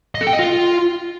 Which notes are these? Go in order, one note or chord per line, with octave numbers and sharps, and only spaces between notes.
D#5
A4
G5
D#5
F4